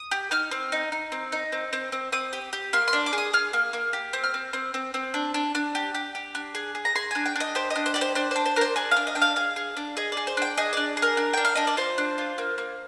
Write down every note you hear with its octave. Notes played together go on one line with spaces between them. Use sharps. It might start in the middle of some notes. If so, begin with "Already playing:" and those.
Already playing: D#6
G4
D#4 F6
C4
D#4
D#4
C4
D#4
C4
C4
C4
C4 D#6
G4
G4
A#3 C6
C6
D4
D6
G#4
D#6
G#4 F6
A#3
A#3
G4
C4
F6
C4
C4
C4
C4
D4
D4
D4
G4
G4
G4
D4
G#4
G#4
A#5
G#4 C6
D4 G#5
G5
D4 D#5
G4 C5
D#5
D4
C5
G4 D5
C5
D4 C5
D4 C5
C5
D4 A#4
C5
G#4 D5
F5
D4
D#5
D4 G5
F5
G#4 F5
G#4
D4
G#4 D#5
G#4 D5
C5
D4 G5
G#4 D#5
D4 D5
G#4
A#4
D4
D4 G5
F5
D4 D#5
D5
F4 C5
D4
F4
A#3
A#3